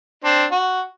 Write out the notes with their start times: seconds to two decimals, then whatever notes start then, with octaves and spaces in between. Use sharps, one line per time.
0.24 C4 D4
0.51 F#4